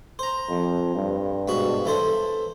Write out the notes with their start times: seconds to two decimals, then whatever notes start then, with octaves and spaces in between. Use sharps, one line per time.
0.19 C5 A#5
0.49 F2
0.96 G2
1.48 G#2 B2 F#4
1.85 E3 A4 C5